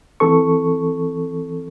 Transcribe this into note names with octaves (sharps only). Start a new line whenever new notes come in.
E3 C4 A4 C#6